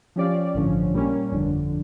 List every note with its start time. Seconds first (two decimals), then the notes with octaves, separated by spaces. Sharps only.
0.16 F3 C#4 G4 D5 F5
0.54 A1 G2 D3 F3 C#4
0.94 A#2 G3 A#3 C#4
1.32 G1 F2 D3